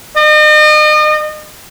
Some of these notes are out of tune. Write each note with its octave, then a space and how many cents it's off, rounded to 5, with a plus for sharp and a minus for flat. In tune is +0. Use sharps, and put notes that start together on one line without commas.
D#5 -40